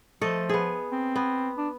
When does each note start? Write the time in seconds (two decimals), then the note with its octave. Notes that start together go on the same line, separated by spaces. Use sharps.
0.21 F3 A3 A4 D#5
0.49 B3 G#4
0.92 C4
1.16 B3
1.58 D4